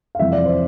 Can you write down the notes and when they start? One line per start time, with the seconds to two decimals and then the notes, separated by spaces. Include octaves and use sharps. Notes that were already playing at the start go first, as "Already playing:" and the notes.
0.15 F5
0.19 F2 C3 E3 E5
0.32 D5
0.46 C5